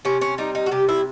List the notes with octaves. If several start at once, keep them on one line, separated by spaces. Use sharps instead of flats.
C3 C#4
C#4
G3 D#4
D#4
F#4
C3 G4
E4